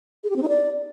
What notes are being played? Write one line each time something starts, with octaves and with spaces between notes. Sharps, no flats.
G#4
G4
C4
D#4
D5